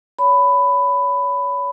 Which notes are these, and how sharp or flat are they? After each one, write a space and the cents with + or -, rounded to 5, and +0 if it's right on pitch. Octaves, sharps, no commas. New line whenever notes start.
C#5 +30 B5 +15